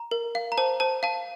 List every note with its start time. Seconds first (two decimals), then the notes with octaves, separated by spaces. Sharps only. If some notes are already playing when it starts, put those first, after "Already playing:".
Already playing: A#5
0.11 A#4
0.35 F5
0.52 A#5
0.58 C5 A5
0.80 C5 A5
1.03 F5 A5